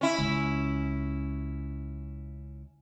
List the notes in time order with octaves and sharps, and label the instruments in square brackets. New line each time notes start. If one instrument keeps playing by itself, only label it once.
[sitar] C#4 E4
[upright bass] C#2